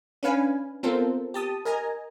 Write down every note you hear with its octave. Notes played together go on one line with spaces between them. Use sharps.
C#4 D4 B4 F5 G#5
B3 C4 F4 A4 A#4 C5
G4 A5 D#6
A#4 D#5 G#5 A#5